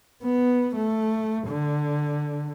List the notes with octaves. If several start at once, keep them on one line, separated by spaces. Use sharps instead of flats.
B3
A3
D3